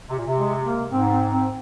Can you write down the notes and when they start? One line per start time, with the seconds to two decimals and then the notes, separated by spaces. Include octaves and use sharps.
0.09 C3
0.18 A#2
0.27 C3
0.36 G#3
0.64 A#3
0.91 G#2 C4
1.11 C4
1.31 C4